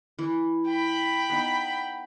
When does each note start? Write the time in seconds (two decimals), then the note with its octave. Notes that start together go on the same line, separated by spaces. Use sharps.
0.19 E3
0.68 G5 B5
1.30 B3 D#4